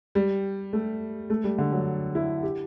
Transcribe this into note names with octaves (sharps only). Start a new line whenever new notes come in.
G3
A3
A3
G3
D3
F#3
E4
G4